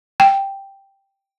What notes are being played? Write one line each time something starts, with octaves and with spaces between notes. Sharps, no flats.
G5